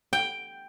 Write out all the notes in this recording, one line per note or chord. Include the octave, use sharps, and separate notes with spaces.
G5